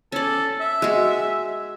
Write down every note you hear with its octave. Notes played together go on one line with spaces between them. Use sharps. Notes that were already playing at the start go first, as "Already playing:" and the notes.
C#4 A4 D5
E5
G#3 F#4